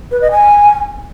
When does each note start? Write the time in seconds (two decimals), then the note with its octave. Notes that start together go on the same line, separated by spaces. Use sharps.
0.11 B4
0.21 D#5
0.32 G#5